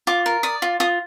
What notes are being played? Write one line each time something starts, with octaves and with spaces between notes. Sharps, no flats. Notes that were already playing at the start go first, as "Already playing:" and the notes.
F4 D6
A#4
D5 D#6
F4
F4 D#6